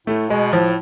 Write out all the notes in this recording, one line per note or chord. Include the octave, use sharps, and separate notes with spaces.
A2 A3
B2 G#3
A2 F3